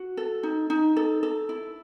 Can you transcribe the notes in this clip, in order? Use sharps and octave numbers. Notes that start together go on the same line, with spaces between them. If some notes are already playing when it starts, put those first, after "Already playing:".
Already playing: F#4
A4
D#4
D#4
A4
A4
E4